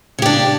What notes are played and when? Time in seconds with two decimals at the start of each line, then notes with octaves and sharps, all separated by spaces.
0.19 C#3
0.22 G4
0.26 D4